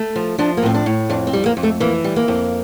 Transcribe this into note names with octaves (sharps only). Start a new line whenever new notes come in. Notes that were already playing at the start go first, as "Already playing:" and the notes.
Already playing: A3
F3
F3 D4
A#3
A2 C4
D4
A2
F2 D4
C4
G3
A#3
F2
A3
E3 A#3
G3
A#3
F2